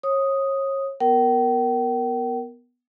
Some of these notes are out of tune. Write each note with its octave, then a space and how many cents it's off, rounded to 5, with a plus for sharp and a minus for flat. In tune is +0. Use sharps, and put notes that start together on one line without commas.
C#5 -30 D#6 +0
B3 -5 A#4 +0 G5 -40